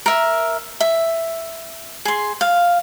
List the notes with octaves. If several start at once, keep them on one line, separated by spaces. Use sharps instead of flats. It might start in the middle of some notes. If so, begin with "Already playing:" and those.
A#4 E5
E5
G#4 C6
F5